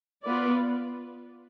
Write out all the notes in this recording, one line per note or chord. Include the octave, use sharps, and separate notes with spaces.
B3 F4 B4 D5